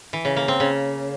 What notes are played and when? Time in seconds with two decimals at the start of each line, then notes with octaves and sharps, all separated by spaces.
0.13 E3
0.25 C#3
0.37 A#3
0.48 C4
0.60 C#3